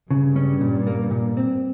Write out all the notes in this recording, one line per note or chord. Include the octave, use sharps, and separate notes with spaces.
G2 C#3
C#4
A#2
A#3
A#2
C4